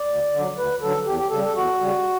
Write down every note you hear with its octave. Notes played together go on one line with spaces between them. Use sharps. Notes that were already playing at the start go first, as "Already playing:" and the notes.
Already playing: D5
D2
D3 F#3
D2 B4
D3 F#3 A4
E2 G4
G4
C#3 G3 A4
A4
E2 F#4
C#3 G3